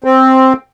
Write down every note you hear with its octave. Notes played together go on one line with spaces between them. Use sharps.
C4